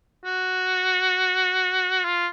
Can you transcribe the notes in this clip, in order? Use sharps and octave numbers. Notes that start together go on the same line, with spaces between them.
F#4
F4